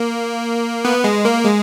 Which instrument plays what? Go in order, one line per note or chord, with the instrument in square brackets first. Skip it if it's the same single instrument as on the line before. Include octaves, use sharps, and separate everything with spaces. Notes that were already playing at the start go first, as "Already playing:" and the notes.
Already playing: [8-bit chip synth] A#3
B3
G#3
A#3
G#3